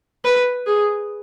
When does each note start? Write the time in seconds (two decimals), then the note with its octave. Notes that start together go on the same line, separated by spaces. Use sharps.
0.24 B4
0.66 G#4